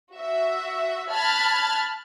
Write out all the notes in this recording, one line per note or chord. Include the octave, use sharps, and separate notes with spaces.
F#4 E5
A5 B5 F6 F#6 G#6 A6